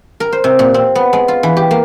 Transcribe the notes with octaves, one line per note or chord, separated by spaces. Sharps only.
A#4
C5
C3
A#2
C4
B3
G#3
F4
E3
G4
A#3